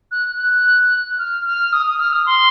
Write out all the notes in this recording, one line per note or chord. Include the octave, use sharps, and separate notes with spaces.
F#6
F#6
F6
F6
D#6
D#6
F6
D#6
C6